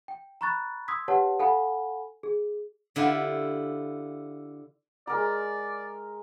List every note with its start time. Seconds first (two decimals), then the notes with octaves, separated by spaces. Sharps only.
0.08 G5
0.41 A#5 B5 C#6 F#6 A6
0.88 C6 D#6 E6 G#6 B6
1.08 G4 B4 C#5 F#5 A5
1.39 A4 F5 F#5 G#5 B5
2.23 G#4
2.96 D3 E4 F4 G4
5.07 G#3 A#4 D5 A#5